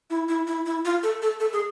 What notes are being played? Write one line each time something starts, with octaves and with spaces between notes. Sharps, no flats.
E4
E4
E4
E4
F4
A4
A4
A4
G#4